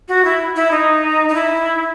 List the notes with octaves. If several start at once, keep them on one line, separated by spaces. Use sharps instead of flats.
F#4
E4
E4
D#4
D#4
E4